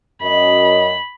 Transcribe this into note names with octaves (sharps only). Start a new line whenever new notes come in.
F#2 D#5 B5